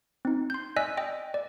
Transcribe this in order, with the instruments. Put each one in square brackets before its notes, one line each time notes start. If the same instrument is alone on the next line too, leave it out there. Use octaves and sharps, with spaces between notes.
[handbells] C4 D#4
C6 G6
D5 D#5 G#5 E6 F#6 B6
D#5 G5
D5